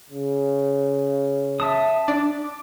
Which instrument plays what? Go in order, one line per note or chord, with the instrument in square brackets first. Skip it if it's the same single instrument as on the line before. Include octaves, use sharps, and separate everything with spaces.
[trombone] C#3
[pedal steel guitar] E5 A5 D#6
[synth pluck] D4 [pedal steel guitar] D6